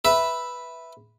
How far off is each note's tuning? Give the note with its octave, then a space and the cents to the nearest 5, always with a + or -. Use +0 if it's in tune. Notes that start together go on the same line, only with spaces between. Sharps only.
B4 +0 E5 +0